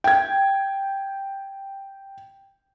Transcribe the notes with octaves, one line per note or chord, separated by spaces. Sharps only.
G5 G#6